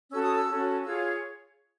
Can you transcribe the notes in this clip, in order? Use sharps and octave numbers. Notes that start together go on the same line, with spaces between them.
C#4 F#4 A4 E6
D#6
E6
C#4 F#4 A4
F4 G#4 C#5 E6